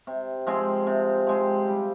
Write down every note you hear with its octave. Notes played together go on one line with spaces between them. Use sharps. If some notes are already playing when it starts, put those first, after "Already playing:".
C3
F3 G#3 C4
C3
F3 G#3 C4
G3